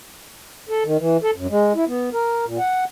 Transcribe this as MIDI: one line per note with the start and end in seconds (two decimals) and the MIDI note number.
0.69 0.84 69
0.85 0.97 51
0.98 1.17 52
1.23 1.31 69
1.36 1.47 42
1.50 1.73 56
1.75 1.85 64
1.87 2.09 59
2.13 2.45 70
2.46 2.58 46
2.59 2.84 78